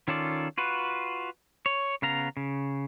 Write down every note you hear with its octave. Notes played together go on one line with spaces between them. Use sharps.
D#3 C#4 F4 A4 D5
F4 F#4 B4
C#5
C#3 B3 F5 A#5
C#3